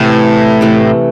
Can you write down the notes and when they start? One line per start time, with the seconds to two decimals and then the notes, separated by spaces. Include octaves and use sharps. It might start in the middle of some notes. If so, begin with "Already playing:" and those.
Already playing: A2 C3 E3 A3
0.61 C3 E3 A3